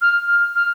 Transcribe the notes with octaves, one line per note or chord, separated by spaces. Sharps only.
F6
F6
F6